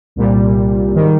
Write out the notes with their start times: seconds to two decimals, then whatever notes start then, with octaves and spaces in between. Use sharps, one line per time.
0.16 C2 A#2 G3
0.93 G#2 D#3 G3